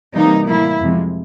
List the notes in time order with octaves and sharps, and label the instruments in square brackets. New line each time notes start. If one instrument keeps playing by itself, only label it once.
[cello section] C3 E3 G3 A#3 D#4
A2 E3 G3 A#3 E4
F2 C3 F3 G#3